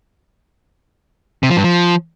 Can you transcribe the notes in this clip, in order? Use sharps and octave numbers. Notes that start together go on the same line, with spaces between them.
C3
F3
G2
F3